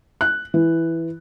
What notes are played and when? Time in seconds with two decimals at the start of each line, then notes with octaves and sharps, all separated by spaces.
0.21 F#6
0.54 E3